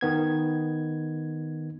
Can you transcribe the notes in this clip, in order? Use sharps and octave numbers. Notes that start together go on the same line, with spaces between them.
D#3 B3 G#6